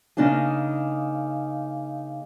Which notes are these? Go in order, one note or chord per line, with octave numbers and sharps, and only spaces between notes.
C#3 A#3 D4 D#4 G#4